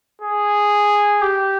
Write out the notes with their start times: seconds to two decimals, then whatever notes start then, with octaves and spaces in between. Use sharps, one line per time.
0.22 G#4
1.22 G4